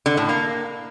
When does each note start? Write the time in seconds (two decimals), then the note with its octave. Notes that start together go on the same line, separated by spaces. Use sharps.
0.06 D3
0.17 A2
0.29 A#3